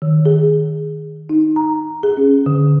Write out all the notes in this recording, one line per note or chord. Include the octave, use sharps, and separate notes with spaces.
D#3
G#4
D#4
A#5
G#4
C#4
D3